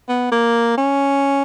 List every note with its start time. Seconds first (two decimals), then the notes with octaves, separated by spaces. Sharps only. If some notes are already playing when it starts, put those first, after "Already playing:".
0.08 B3
0.31 A#3
0.77 C#4